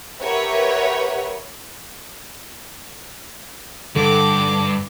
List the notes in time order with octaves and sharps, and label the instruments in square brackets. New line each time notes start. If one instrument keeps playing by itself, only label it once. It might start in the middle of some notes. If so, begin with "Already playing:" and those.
[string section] G4 A#4 B4 C#5 E5 F#5
[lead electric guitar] G2 [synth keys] D3 [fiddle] D6